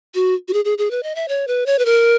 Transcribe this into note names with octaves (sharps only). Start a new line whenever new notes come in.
F#4
F#4
G#4
G#4
G#4
B4
D#5
E5
C#5
B4
C#5
B4
A#4